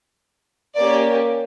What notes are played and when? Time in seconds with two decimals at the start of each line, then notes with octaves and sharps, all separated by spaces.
0.75 A#3 C#4 G4 D5